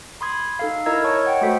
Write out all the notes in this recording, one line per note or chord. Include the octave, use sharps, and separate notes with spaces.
B5 C6 D#6 G#6
D#4 A4 F5
E4 A#4 D#5 A#5 E6 G#6
C#5 A5 C#6
D#5 F#5 G5
A3 F#4 A4 C5 B6